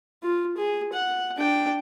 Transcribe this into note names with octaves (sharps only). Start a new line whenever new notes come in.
F4
G#4
F#5
D4 G5